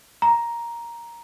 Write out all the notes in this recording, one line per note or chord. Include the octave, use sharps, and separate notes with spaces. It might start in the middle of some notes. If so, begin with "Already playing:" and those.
A#5